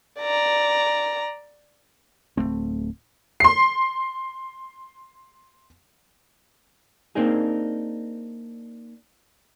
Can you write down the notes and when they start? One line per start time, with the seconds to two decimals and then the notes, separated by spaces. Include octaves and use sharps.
0.20 D5 A#5
2.37 D1 G#2 A3 C4
3.40 C6 C7
7.15 A#3 C4 D4 D#4 G#4